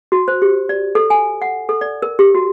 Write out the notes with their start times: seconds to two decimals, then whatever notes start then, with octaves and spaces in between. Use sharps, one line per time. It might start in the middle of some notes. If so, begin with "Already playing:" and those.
0.12 F#4
0.28 C5
0.42 G4
0.69 D5
0.95 A4
1.10 G#5
1.42 F#5
1.69 A4
1.81 D5
2.02 A#4
2.19 G4
2.35 F#4